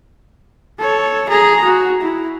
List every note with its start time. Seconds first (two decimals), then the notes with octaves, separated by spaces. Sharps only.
0.79 A4 C#5
1.29 G#4 A#5
1.65 F#4
2.01 E4